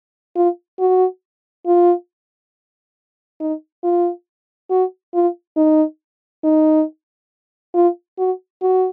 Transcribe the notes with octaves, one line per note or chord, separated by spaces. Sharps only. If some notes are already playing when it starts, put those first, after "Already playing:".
F4
F#4
F4
D#4
F4
F#4
F4
D#4
D#4
F4
F#4
F#4